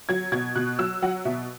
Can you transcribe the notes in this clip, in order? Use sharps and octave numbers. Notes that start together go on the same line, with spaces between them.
F#3 G#6
B2 G#6
B2 F#6
F#3 E6
F#3 F#5
B2 E5